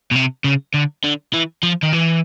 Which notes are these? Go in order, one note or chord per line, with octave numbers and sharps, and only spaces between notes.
B2
C3
C#3
D3
D3
E3
F3
D#3
E3